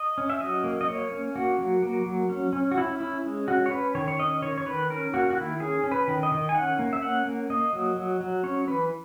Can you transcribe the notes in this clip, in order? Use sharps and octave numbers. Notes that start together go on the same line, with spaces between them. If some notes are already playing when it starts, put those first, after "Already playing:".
Already playing: D#5
C#4
E5
F#3 D#5
A#3
D#5
A#3 C#5
C#4
A#3 F#4
F#3
A#3
F#3
C#4
C#4
F#4
C#4 E4
C#4 E4
G#3
C#4 F#4
C#5
C#4 B4
D#3 C#5
C#5
C#4 D#5
D#3 C#5
C#5
D#3 B4
C#4 A#4
A#3 F#4
F#4
D#3 E4
C#4 G#4
C#4
B4
D#3
D#5
D#3
G#5
C#4 F#5
A#3
E5
C#4 F#5
A#3
A#3 D#5
F#3
F#3
F#3
C#4 C#5
E3 B4